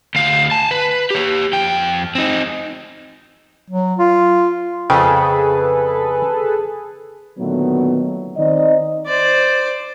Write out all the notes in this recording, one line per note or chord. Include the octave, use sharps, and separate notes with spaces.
D2 F5
G#5 A5
B4
G4 C#5
F2 G5
C4 D#4
F#3
F4
F2 C#3 G#4 A4 B4 G5
A#2 D3 D#3 F#3 A3 B3
D#3 C4 D#4 D5 D#5
C5 D5